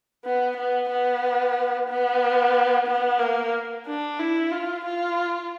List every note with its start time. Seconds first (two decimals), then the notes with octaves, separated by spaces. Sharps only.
0.25 B3
0.57 B3
0.89 B3
1.89 B3
2.87 B3
3.19 A#3
3.86 D4
4.19 E4
4.52 F4
4.84 F4